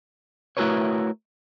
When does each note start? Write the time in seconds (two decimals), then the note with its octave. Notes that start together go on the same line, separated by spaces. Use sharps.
0.57 A3 E4 F#4 A#4 B4 C#5